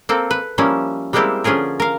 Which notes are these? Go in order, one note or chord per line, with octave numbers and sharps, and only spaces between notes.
A#3 C4 A4
B4
F3 G3 A#3 C#4 E4
G3 G#3 A#3 C4 E4 G4
D3 F3 C#4 F4 G#4 A#4
A#4 F5